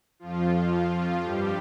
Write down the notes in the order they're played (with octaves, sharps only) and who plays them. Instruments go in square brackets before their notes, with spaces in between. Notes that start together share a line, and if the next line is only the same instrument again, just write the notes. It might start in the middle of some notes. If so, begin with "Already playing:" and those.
[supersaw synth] F2 F3 F4
G2 G3 G4